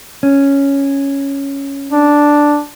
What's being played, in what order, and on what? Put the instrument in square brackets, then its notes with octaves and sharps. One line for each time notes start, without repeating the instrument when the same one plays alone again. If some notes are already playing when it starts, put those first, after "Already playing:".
[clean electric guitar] C#4
[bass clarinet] D4